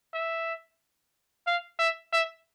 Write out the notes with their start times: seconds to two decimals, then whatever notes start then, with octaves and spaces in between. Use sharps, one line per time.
0.14 E5
1.47 F5
1.79 E5
2.13 E5